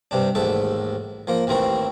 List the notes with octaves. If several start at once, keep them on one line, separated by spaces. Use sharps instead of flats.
G2 C3 D4
A1 D#2 G#2 A4 E5
F3 A#3 A#4
A1 D#2 E3 C4 A#4 C#6